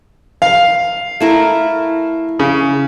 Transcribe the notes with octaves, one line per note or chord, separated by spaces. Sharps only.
F5
A3 E4 A#4
C#3